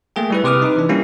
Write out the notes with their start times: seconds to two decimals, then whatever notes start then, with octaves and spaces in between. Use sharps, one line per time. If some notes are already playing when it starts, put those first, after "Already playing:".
0.16 A3 A#3 G#4 G5
0.30 G3 E4 B4
0.44 C3 B4 D6 D#6 F6
0.62 D#4 B4
0.76 E3 D4
0.89 G3 A#3 C#4 E4 G4